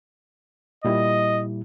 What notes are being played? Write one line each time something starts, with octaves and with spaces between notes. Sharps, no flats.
A#2 G3 E4 D#5